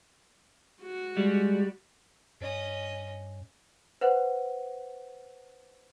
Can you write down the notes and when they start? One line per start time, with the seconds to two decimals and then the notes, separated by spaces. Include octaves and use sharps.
0.82 F#4
1.17 G3 G#3
2.41 G2 C#4 D#5
4.01 B4 C5 F#5